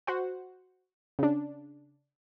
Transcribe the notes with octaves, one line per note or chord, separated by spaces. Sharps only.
F#4 C5 F#5
C#3 D4